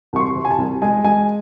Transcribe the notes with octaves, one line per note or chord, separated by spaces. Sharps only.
C2 C#6
C6
C3
G#5
A5
C2
G#3 G#5
G#3 G#5